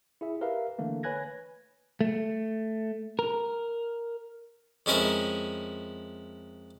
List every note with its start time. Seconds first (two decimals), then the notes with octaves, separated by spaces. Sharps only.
0.21 E4 G#4 E5
0.41 G4 A#4 B4 E5 F5
0.79 D3 E3 A3 A#3
1.03 B4 C#5 G#5 F#6 G#6 A#6
2.01 A3
3.19 A#4
4.86 F2 G#3 C#4 E4 A#4